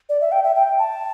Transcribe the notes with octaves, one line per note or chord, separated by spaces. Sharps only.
D5
E5
G5
E5
G5
A5